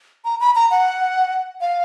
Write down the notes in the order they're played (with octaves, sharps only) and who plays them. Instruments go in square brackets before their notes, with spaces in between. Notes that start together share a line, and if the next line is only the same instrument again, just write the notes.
[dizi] A#5
B5
A#5
F#5
F5